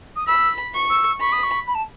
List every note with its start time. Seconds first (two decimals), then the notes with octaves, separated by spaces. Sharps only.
0.16 D#6
0.27 B5 E6
0.74 C#6
0.90 E6
1.20 B5 C#6
1.32 D#6
1.43 C#6
1.67 B5
1.74 A5